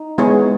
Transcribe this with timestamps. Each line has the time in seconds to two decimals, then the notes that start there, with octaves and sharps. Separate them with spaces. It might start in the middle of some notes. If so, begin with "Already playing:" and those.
Already playing: D#4
0.18 G#3 B3 E4 G#4 C#5